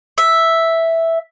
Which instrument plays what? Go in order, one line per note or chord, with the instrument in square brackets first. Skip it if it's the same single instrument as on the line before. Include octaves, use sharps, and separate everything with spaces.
[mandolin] E5